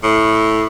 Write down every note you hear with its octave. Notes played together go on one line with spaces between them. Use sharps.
A2